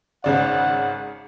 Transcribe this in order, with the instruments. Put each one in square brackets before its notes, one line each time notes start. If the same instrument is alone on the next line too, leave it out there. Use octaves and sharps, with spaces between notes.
[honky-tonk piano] G#1 C#3 D5 [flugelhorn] F#5